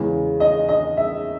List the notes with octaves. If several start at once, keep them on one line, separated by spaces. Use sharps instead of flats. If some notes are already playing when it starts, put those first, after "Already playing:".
Already playing: E2 C#3 G#3
D#5
D#5
E5